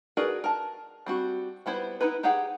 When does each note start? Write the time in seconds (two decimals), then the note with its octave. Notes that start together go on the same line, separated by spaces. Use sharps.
0.17 F#4 G#4 A#4 B4 D5
0.44 A#4 A5
1.06 G3 C4 F#4
1.66 G3 B3 E4 C5
2.01 B3 D#4 E4 B4
2.23 D#4 G4 G#4 C#5 F#5